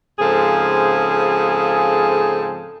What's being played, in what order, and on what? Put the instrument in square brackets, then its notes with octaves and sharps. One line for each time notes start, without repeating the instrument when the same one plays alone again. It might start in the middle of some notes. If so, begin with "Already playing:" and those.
[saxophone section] G#2 C#3 F3 C4 G#4 A4